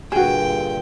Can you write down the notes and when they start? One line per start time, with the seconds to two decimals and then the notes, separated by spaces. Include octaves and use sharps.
0.12 G2 A#2 D3 F#4 G#4 G5